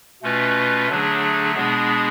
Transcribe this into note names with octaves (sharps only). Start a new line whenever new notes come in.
B2 A3 C#4 F4 B4
D3 F#3 A3 D4 G#4
B2 G#3 B3 D4 G#4